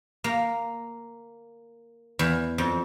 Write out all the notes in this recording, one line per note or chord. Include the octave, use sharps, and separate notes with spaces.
A#3
E2
F2